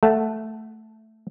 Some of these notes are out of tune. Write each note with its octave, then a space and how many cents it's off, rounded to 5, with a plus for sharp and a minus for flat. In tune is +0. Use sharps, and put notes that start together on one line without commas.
A3 +0 F#5 +0 A5 -5